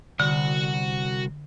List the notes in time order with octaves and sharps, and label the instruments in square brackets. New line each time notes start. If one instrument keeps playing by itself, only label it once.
[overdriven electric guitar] C2 [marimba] D3 [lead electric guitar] F#4 F#5